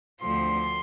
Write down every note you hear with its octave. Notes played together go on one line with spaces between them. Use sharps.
D2 D3 F3 A3 C4 C6